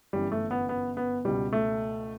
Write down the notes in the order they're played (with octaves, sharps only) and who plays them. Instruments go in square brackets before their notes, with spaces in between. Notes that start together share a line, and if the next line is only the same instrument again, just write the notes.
[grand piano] G1 F#2 E3 G3
A3
B3
B3
B3
C#2 B2 G3
A3